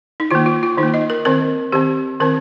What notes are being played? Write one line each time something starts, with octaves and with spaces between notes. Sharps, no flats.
D#4
D#3 A#3 F4
F4
F4
D#3 D#4
A#3
D#5
A#4
D#3 C4 A#4
D#3 C4 G4
D#3 C4 A#4